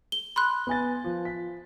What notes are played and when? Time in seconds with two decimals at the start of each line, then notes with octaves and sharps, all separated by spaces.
0.12 G7
0.36 B5 C6 F#6
0.67 B3 G#5 A6
1.04 F3
1.25 B6